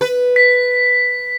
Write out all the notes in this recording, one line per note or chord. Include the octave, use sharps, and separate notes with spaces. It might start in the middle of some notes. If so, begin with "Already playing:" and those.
B4
B6